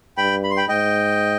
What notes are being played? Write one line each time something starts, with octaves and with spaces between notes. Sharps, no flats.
G2 G5 B5
B5
C6
G5 B5
G#2 D#5 G5